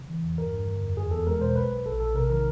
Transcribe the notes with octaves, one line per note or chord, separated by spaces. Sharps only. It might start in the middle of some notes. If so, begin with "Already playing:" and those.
Already playing: C#3
E3
E2
G2 A#4
G2
D3
F2
E2 G#4
E2 A4
G#3 A#4
B2 C5
B1 B4
B1
A#1 A4
A#1 A4
C3 A#4
D#3 A#4